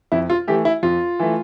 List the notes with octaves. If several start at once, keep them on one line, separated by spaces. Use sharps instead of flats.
F2 E4
F4
E3 A3 G4
E4
F2 F4
E3 A3